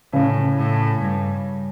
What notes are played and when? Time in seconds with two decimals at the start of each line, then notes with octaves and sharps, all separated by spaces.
0.13 A2 C#3
0.57 A2
1.00 G2